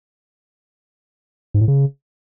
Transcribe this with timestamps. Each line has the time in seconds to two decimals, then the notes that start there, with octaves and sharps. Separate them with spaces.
1.54 G#2
1.61 A2
1.68 C#3